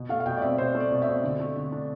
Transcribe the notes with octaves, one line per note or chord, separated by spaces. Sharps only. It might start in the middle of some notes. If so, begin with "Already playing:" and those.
Already playing: B2
A3 F5
F5
B2 G5
D5
C4 E5
B2 C5
A3
D5
B2
E5
C4
D3
A3
D3
D4